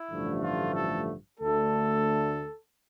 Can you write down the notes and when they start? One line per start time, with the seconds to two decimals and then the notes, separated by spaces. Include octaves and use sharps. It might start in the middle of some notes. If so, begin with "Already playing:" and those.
Already playing: E4
0.10 A1 G2 D3 F3 A3
0.42 F4
0.74 A4
1.39 D2 D3 A3 A4